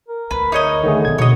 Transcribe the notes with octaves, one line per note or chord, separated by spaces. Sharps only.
A#4
D2 B4
D#4 C#5 D#5
D3 D#3 A3 G#4
C3 B3 G#6
B2 D3 F#4 C#5 D#5